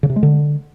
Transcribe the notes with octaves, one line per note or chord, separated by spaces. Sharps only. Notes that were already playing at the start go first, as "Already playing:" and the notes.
C#3
C3
G#3
D3